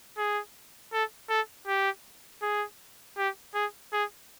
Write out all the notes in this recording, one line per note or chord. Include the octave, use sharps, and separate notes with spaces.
G#4
A4
A4
G4
G#4
G4
G#4
G#4